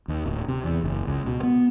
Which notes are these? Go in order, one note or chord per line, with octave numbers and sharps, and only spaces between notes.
D#2
D1
C3
E2
F#1
C#2
B2
B3